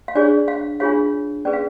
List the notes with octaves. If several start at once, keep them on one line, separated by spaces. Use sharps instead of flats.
F5
D4 G#4 C#5 D5
F5
D4 F4 G#4 C#5 F5
C#4 G#4 B4 D5
F5